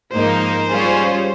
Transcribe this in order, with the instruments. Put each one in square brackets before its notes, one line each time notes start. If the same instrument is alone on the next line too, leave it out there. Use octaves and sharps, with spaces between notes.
[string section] G#2 F3 A#3 D#4 A#4 [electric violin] C5
[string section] G3 C#4 F4 G#4